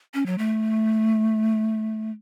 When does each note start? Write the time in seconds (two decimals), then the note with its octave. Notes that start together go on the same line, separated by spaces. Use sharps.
0.14 C#4
0.26 F#3
0.38 A3